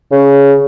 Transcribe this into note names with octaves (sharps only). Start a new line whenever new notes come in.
C#3